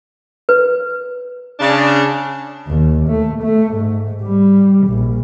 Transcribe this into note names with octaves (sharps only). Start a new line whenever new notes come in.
B4
C#3 D4
D#2
A3
A3
G#2
G3
A#1